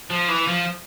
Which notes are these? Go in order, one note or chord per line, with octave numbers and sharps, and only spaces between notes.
F3
E3
F3